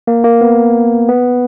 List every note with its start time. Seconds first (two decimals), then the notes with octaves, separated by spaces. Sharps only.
0.07 A#3
0.24 A#3
0.41 B3
1.09 B3